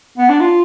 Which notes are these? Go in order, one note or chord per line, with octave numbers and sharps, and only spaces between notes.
B3
D4
F4